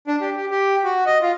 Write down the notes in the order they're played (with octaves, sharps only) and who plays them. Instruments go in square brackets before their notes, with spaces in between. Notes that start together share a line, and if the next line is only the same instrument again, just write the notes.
[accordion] D4
G4
G4
G4
F#4
D#5
F4